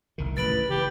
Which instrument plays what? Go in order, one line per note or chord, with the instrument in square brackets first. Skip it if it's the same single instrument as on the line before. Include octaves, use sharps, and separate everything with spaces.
[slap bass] F1 C2 D#3
[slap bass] A1 G#2 D#3 [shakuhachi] B4 [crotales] A6 D7 F#7
[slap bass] C#3 E3 [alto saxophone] G4